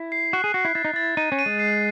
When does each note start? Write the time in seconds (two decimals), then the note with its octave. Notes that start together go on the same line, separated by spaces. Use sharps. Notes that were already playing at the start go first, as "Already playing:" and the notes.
Already playing: E4
0.12 C7
0.33 F#4 F#6
0.44 G#4
0.54 F#4 C7
0.65 E4
0.75 E4 A6
0.85 D#4
0.93 E4 A6
1.17 D#4 D#7
1.32 C#4
1.39 D#7
1.46 G#3
1.59 C7